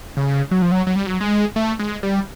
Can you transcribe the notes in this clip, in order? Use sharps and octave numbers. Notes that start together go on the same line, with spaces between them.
C#3
F#3
F3
F#3
F#3
G3
F#3
G#3
A3
G#3
G3